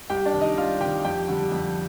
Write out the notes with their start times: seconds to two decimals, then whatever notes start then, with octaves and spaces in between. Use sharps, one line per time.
0.10 C2 G4 G5
0.25 D4 D5
0.33 C3 D#3
0.41 D#4 D#5
0.57 C2 F4 F5
0.81 C3 D#3 G4 G5
1.04 F2 G4 G5
1.28 D3 G3
1.52 F2